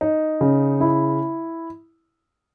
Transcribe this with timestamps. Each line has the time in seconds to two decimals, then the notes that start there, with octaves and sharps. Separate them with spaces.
0.01 D#4
0.41 C#3
0.80 E4